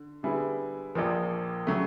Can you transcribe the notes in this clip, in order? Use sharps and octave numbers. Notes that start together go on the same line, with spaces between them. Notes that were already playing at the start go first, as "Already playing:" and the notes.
Already playing: D3
D3 G3 B3 E4 G#4
A#1 A#2 F3 A#3
C#3 F#3 A3